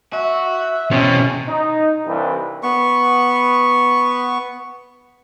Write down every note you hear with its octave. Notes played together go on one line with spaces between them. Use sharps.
F#4 E5
E2 B2 C4 C#4
D#4
C2 G2 E3
B3 C#6